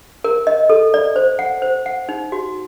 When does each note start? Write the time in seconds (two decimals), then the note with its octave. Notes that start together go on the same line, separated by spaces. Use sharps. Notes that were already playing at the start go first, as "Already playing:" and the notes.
0.24 A#4
0.47 D#5
0.70 A4
0.94 D5
1.16 C5
1.39 F#5
1.62 C5
1.86 F#5
2.09 D#4
2.32 F#4